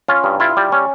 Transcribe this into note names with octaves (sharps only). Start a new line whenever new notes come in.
C#4 F4
G2
E4 F4
G3
C#4